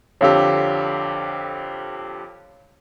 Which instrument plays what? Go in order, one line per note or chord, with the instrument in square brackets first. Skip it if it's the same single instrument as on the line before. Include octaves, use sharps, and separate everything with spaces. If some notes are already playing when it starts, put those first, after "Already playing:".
[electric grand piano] F2 D3 G4 [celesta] C#5 F5 E6